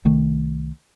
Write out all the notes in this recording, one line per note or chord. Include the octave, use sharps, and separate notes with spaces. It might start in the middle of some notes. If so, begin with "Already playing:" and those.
C2 D#3 A3